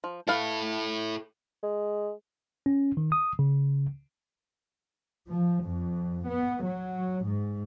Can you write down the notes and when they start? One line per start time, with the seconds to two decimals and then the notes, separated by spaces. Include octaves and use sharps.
0.04 F3
0.28 E4 A4 B4 F5 A5
1.63 G#3
2.66 C#4
2.97 D#3
3.12 D#6
3.39 C#3
5.29 F3
5.65 F2
6.27 B3
6.64 F#3
7.25 G#2